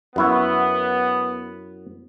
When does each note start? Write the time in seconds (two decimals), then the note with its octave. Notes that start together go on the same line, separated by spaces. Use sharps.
0.16 F#2 B3 E4 F#4